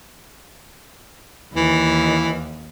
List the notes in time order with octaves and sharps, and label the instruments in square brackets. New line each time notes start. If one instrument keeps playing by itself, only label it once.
[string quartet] D#2 [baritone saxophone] E3